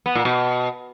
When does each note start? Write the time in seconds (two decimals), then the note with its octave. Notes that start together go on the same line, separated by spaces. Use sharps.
0.06 B3
0.15 A#2
0.25 B2